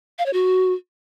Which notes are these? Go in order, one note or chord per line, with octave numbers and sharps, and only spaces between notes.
F5
C#5
F#4